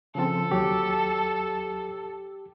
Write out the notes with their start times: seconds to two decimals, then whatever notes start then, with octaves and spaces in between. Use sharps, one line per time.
0.15 C#3 F3 C4 A4
0.51 D#2 F#3 G4 C#5